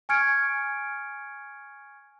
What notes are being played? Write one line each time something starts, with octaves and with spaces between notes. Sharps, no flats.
G#5 C#6 F6 G#6 C#7 D7